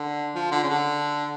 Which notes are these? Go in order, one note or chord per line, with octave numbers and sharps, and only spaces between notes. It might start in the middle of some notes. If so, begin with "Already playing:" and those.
Already playing: D3
F3
D3
C#3
D3